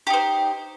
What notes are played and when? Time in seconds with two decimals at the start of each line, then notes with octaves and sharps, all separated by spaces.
0.07 G4
0.10 D#4
0.14 C5